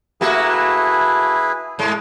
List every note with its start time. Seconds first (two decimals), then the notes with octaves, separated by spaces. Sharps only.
0.21 A3 A#3 E4 F#4 G#4 B4
1.79 G#2 G#3